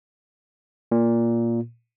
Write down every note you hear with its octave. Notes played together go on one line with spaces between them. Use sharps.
A#2